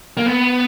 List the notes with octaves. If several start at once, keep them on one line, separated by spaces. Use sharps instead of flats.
A#3
B3